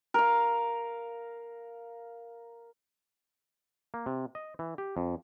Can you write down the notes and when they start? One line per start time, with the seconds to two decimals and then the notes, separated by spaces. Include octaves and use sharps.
0.14 A#4 F5
3.94 A#3
4.06 C3
4.35 D#5
4.59 E3
4.78 G4
4.97 F2